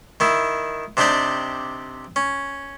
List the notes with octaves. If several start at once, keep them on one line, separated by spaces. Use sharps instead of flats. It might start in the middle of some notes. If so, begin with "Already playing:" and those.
D#3 E4
C3 D4 D#4 G4 D5
C#4